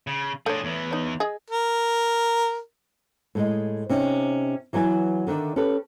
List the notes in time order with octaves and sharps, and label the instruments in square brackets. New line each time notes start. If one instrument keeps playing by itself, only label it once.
[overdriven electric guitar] C#3
[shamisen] A3 C#5 [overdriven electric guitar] D4 G#4
[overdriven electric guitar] E2 E3
[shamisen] D#4 C#5
G#4 D#5
[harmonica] A#4
[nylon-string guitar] A2 G#3 D#5
C3 C#4 D#4
E3 F#3 B3 G#5
D3 D#3 D4 E5
C#4 G4 A4 B4